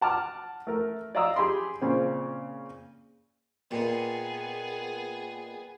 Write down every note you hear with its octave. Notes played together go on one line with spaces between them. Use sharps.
F#5 A5 D6 F6
A3 A#4
D5 D#5 F5 A#5 D#6 E6
G4 G#4 B5 C6
A#2 C#3 C4
A#2 B3 G#4 B4 D#5 G5